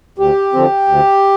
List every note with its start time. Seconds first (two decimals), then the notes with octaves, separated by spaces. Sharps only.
0.18 D2 G4
0.53 D3 F3 C4
0.88 D2